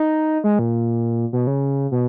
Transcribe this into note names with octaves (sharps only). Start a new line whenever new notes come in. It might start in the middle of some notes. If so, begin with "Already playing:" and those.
Already playing: D#4
G#3
A#2
B2
C#3
B2